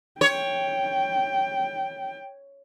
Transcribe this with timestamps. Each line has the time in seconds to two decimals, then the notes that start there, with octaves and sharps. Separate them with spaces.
0.21 C#5 G5